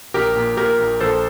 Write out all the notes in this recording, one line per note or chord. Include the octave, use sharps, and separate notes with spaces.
A#1 G4 A#4
A#2
A#2 G4 A#4
A#1
A#1 A4 C5